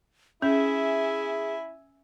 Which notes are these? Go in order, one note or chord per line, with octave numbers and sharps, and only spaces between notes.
C#4 E4 G#4 E5 G#5